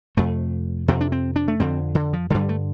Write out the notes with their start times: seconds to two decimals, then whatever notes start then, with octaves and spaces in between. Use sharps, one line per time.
0.17 F2 C3 A3
0.88 F2 C3 C4
1.01 D4
1.12 C4
1.36 D4
1.48 A3
1.60 F2 D3 C4
1.95 D3
2.13 F3
2.30 G2 D3 G3
2.49 A3